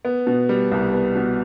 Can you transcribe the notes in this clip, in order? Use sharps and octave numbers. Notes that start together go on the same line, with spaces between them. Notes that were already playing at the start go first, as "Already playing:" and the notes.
B3
B2
G3
C2
B3
B2